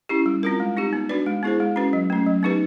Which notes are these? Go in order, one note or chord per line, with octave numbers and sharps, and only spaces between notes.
C#4 E4 G4
G3
C4 F4 A#4
G#3
C4 D#4 G4
B3
D4 F#4 B4 D5
G#3
B3 E4 G#4 C5
G#3
C#4 F#4 B4
F#3
A3 C#4
F#3
B3 D#4 G4 B4